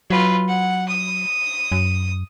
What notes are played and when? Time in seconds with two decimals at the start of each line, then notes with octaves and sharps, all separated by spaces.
0.10 F#3 F4 B4
0.48 F#5
0.88 D#6
1.72 F#2